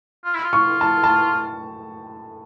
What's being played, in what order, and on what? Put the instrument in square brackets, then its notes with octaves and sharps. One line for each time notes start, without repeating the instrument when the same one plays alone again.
[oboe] F4
E4
F4
[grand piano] C#6
A5
A5